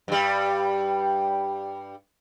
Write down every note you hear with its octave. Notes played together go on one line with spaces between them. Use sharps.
G2 G3